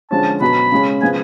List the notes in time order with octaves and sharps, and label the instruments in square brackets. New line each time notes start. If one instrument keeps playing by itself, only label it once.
[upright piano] D3 F3 G#3 C#4 [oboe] A5
[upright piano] B2 F#3 B3 [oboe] B5
[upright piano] C#3 G#3 C#4
[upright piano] C#3 F3 G#3 B3 [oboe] G#5